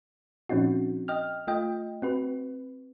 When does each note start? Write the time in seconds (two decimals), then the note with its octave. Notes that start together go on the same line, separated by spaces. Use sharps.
0.49 A#2 F3 C4 C#4 D#4 F#4
1.08 D#5 G5 F6
1.47 A3 F4 D#5 G5
2.02 C4 F#4 B4